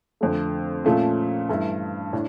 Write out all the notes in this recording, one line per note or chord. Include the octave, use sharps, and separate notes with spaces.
F2 D3 A3
A#2 F3 A3 C#4
G2 E3 A3 E4
A2 D4